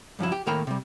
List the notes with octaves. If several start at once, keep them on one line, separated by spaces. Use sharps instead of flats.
G2 F3 F#3 E4
G4
A2 D#3 A#3 A#4 G5 B5
C3 G3